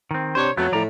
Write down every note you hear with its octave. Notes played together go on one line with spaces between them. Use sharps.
D#3 C4
C3 D4 C5 C#5
F2 F#3 A3 B3
A2 F3 D5 A#5